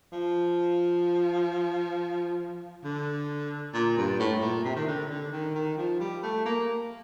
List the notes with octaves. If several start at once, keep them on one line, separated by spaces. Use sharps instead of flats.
F3
D3
A#2
G2
A2
A#2
C3
D#3
D3
D3
D#3
D#3
F3
G3
A3
A#3